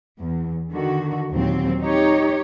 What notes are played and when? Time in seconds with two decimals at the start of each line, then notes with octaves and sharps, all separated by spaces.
0.18 E2
0.71 D3 D#3 F#4
1.32 D#2 A#2 F#3 C4
1.81 D#4 G4 C#5